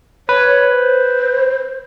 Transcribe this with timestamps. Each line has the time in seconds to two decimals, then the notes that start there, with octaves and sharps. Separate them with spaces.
0.29 B4 C#5
0.72 C5